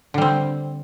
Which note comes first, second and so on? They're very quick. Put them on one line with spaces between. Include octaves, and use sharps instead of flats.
D3 G3 C4